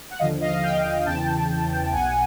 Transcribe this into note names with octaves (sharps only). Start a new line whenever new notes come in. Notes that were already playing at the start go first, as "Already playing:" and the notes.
F#5
D#2 D3 F3 D#5 F5
D#5 F5
F5 G5
F5 G5
E2 C#3 E3 G5 A5
B1 B2 F#5 G#5